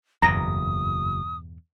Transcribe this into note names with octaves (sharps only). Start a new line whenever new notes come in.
F#1 E2 G2 B2 A#5 D#6